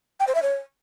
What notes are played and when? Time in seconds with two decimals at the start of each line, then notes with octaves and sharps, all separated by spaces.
0.20 G5
0.27 C5
0.35 E5
0.42 C#5